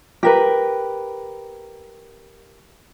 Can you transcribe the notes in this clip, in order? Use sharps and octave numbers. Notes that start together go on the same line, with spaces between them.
G4 A#4 B4